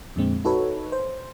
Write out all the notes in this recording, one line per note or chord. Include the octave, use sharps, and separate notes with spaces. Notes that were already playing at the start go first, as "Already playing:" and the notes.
F2 A#2 D3 G#3 C4
D#4 F#4 A4 B4 C#5
C5